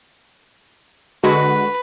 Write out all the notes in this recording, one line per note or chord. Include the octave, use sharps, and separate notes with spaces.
D3 G#3 F#4 B4